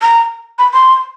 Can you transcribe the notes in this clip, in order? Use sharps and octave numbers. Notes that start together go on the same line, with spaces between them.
A#5
B5
C6